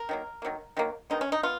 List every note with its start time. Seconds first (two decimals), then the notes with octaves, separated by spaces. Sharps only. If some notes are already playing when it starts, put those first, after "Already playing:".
Already playing: A#4
0.09 D#3 F#3 A#3
0.42 D#3 F#3 A#3
0.77 D#3 F#3 A#3
1.10 D#3 G#3 B3 D#4
1.21 C#4
1.32 D#4
1.43 B3 F4